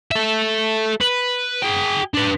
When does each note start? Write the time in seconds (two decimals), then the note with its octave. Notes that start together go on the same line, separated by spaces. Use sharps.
0.11 A4 E5
1.01 B4
1.63 G#4 G5
2.14 D4 B4